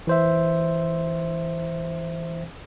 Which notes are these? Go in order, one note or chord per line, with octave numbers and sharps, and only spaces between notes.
E3 C5 E5